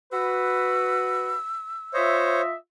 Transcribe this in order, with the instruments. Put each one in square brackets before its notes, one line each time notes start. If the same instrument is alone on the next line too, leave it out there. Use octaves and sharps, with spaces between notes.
[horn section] F#4 B4 [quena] E6
[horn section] F4 D#5 E5 [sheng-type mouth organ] C5 C#5